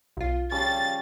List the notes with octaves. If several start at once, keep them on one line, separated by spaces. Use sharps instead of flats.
B1 F4
C#3 F3 G3 A6